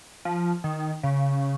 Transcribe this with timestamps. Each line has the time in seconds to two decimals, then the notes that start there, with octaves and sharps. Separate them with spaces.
0.25 F3
0.64 D#3
1.03 C#3